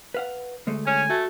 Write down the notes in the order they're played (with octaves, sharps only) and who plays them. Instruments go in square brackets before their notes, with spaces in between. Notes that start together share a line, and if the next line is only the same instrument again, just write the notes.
[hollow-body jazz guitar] B4 F5 F#5
D2 G#3 A3
[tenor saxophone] C#4 [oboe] G#5
[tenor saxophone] A3 [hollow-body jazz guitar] F#4